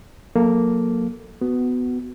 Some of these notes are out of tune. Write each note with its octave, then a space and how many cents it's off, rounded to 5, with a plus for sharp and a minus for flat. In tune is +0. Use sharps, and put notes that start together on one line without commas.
F#3 -30 A#3 +0 A4 +0
B3 +15 F#4 +5